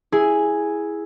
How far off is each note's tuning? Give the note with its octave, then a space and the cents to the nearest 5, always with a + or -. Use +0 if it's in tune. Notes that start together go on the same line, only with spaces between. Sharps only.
E4 -5 G#4 +0